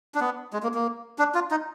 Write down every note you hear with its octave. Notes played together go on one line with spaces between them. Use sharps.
D4
B3
G#3
A#3
A#3
D4
F4
D#4